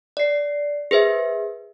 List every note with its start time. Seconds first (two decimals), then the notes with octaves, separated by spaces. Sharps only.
0.17 D5 C7
0.91 G#4 B4 C5 E5